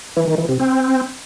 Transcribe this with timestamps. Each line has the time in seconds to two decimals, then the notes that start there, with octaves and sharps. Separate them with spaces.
0.17 E3
0.27 D#3
0.38 E3
0.49 C3
0.59 C4